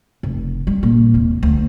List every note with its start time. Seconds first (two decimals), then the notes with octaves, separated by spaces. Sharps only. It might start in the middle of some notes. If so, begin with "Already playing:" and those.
0.23 F1
0.67 G3
0.83 A#1 A#2
1.14 E2 C3
1.43 D2